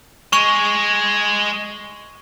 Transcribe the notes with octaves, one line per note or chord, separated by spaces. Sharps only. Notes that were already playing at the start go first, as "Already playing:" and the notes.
G#3 C#6 F7